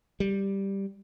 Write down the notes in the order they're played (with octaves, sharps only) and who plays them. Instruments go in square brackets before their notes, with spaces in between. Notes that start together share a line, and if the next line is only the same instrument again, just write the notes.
[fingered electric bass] G3